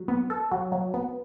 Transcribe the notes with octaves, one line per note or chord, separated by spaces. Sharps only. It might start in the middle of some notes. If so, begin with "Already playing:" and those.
Already playing: F#3
B3
A4
F#3
F#3
B3